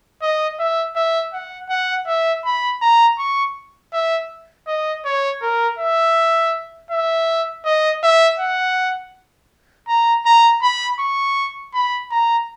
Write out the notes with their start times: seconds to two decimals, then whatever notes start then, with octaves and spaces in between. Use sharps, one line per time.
0.22 D#5
0.59 E5
0.96 E5
1.33 F#5
1.69 F#5
2.07 E5
2.45 B5
2.82 A#5
3.19 C#6
3.93 E5
4.67 D#5
5.05 C#5
5.42 A#4
5.79 E5
6.91 E5
7.65 D#5
8.03 E5
8.39 F#5
9.88 A#5
10.26 A#5
10.62 B5
10.99 C#6
11.74 B5
12.11 A#5